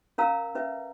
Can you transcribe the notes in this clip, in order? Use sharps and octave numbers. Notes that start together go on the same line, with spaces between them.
C#4 A#4 F5 A#5 E6
C#4 B4 E5